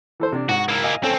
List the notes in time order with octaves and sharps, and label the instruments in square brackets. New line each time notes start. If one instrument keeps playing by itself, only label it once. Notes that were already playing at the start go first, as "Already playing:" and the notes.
[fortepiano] E3 A4 C5
C3 D4
[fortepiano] G#2 [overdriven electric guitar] F#4
[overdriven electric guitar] A#3 E4
[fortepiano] D#5 F5 G#5
[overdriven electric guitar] C4 C#4 [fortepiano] A4